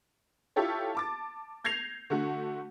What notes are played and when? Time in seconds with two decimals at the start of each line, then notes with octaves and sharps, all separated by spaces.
0.56 E4 F4 G4 A4 C#5
0.95 A5 D6 A6
1.64 G6 G#6 A#6 C7 F7
2.10 D3 A3 F#4